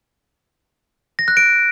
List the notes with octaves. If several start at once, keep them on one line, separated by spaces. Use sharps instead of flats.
A#6
F#6
D7